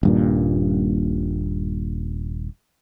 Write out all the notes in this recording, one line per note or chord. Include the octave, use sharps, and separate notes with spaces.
D#1 G2 A#2